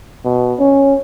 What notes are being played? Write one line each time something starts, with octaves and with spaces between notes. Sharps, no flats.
B2
C#4